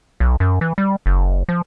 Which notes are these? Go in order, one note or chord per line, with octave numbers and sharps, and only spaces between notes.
B1
F#2
E3
G3
F#1
F3